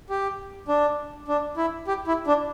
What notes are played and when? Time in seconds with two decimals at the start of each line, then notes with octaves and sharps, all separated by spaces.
0.10 G4
0.68 D4
1.28 D4
1.57 E4
1.87 G4
2.07 E4
2.27 D4